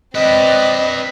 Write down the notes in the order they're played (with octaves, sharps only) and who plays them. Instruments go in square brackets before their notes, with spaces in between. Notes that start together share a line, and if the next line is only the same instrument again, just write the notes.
[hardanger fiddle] C4 D5 [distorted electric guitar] B4 G5 [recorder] D#5